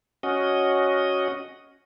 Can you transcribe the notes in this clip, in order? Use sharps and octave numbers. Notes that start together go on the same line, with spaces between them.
C#4 F#4 D#5